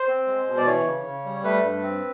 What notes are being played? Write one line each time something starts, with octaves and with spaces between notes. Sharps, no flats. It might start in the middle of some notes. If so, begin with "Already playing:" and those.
Already playing: C5
C4
G#3
B2
D5
E3 C#5
C#3
C#3
G3
A3 B4
G2
C4